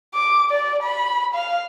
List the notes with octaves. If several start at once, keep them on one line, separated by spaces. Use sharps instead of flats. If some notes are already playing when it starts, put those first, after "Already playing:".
D6
D5
B5
F5